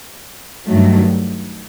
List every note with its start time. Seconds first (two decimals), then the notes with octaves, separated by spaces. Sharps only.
0.67 G2 D#3 F#3 A3